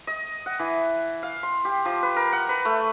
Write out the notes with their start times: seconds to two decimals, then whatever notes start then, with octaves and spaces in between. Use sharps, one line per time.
0.07 D#5
0.46 F#5
0.59 E3
1.23 F5
1.43 C6
1.65 G4
1.85 F3
2.03 B4
2.16 A#4
2.33 F#5
2.49 B4
2.65 A3